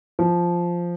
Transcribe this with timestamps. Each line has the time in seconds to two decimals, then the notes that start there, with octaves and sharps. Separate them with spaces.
0.19 F3